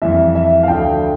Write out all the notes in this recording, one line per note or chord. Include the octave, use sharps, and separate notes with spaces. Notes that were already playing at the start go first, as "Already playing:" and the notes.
F2 E3 G3 E5
E5
F5
D2 D3 F3 A3 G5